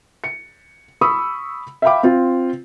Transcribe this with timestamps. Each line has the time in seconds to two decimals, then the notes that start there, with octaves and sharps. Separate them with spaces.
0.24 C#7
1.01 B5 C#6 D#6 E6
1.82 E5 F5 G5 B5 D6
2.03 C4 F4